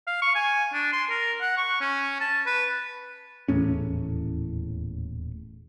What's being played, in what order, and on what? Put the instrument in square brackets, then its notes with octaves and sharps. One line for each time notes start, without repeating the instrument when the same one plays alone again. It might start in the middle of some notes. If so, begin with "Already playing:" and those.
[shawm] F5
C#6
G#5
D4
C6
A#4
F#5
C#6
C#4
A5
B4
[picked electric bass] D#1 E2 A2 C#4